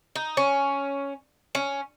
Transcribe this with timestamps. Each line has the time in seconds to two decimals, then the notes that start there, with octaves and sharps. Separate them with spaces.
0.16 D#4
0.37 C#4
1.55 C#4